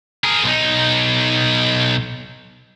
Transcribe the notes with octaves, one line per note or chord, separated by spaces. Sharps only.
G#4 A#4
B1 D#4